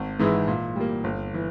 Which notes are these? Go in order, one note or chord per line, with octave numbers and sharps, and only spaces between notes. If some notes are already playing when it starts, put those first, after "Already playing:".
Already playing: G#1
G#2 E3 G#3 E4
A#2
G3 A#3
G1
E3